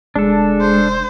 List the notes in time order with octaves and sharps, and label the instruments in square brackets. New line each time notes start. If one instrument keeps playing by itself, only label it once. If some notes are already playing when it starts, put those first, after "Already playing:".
[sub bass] F1 [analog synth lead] G#3 [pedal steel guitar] D4 A4
[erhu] C5